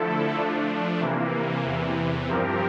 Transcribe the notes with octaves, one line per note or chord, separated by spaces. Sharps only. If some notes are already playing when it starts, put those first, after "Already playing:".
Already playing: D3 F3 A3 E4 A4
F3 A3 D4
C3 E3 A#3
E2 C3 E3
G2 F3 C4 G4 A#4